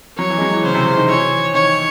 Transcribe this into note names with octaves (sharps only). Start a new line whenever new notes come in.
F#3 C#5
E3
G#3
F#3
E3
C#3 C5
C3
C#3
D#3
E3 C#5
D#3 C#5